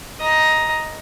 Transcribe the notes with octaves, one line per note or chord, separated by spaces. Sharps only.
D#5 A#5